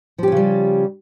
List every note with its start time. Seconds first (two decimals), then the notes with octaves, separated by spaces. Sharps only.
0.18 F3
0.23 G4
0.28 C#4
0.32 C#3
0.37 G3